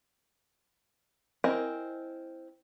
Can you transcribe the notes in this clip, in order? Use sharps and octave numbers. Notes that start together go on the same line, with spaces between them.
C4 E4 A#4 D#5 G#5